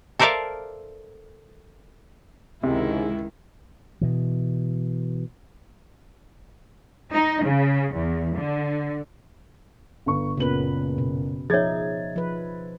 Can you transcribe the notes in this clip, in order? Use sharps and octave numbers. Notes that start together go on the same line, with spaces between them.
A4 A#4 C5 D5 E5 F5
C#2 G#2 C3 D#3 G#3 E4
B2 E3
D#4
C#3
E2
D3
G1 C#6
F#1 A#2 C#3 B3 B4 F#7
B2
F3 D#4 G#4 C#5 E5 G#6 A6
F3 B4